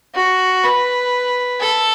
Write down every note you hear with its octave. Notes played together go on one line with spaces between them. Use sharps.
F#4
B4
A4